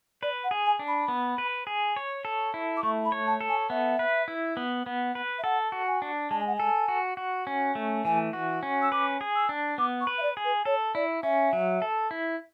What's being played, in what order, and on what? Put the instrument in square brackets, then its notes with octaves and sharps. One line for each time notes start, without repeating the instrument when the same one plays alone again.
[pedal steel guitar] B4 [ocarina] D5
[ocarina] F#5
[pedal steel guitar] G#4
[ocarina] G#5
[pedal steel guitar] D4
[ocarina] B5
[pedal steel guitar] B3
B4
G#4
C#5
A4
E4
[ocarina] D6
[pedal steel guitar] A3 [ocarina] C#6
[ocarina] B5
[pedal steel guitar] C#5
[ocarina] A5
[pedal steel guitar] A4
[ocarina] G#5
[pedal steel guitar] B3 [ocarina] E5
[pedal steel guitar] B4
E4
B3
B3
B4
[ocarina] E5
[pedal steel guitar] A4 [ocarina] F#5
[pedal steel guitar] F#4
[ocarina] G#5
[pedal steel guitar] D4
[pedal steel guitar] G#3 [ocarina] A5
[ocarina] G#5
F#5
G#5
[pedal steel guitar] A4
F#4
F#4
C#4
A3
[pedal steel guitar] E3 [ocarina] G#5
[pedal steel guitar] F#4
C#4
[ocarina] E6
[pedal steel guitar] B4 [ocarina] D6
[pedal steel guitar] G#4
[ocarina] E6
[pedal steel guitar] D4
[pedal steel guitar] B3 [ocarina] D6
[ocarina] C#6
[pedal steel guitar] B4
[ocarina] E5
D5
[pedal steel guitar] G#4
[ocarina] B4
[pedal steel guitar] A4 [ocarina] C#5
[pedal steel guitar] E4 [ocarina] D5
[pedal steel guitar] C#4 [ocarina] E5
[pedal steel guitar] F#3
A4
E4